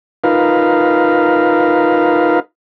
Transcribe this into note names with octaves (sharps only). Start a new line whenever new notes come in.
D#4 F4 A#4 B4 F5